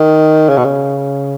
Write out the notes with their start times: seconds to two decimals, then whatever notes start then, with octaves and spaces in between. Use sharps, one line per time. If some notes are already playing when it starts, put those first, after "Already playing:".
Already playing: D#3
0.49 C#3
0.57 B2
0.64 C#3